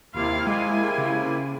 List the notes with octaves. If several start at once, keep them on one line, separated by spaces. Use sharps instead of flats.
D#2 C3 A#3 E4 F4 F5
G#3 F4 G#5
C#3